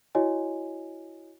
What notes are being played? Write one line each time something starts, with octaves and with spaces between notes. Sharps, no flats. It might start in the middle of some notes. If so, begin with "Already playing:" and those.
E4 F#4 C#5 D#5 G#5